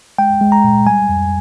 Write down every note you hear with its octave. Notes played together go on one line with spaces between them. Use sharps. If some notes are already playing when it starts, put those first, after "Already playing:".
G#3 G5
G#3
A#5
A#2
G3 G#5
F2